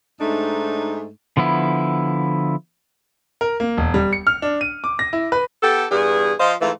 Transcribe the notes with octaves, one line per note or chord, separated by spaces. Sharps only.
G#2 A3 D4 D#4
D3 F3 B3 E4
A#4
A#3
E1
G3
C#7
F6
D4
D#7
D6
A#6
E4
B4
B3 G4 A4
E2 G2 G#4
F3 C5 D#5 F5
G#2 E3 A3 F4